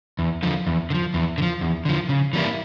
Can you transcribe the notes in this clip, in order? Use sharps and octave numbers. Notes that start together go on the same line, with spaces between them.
E2
D3 F3
E2
D3
F3
E2
D3
F3
E2
D3 F3
C#3
E3 G3 A#3 E4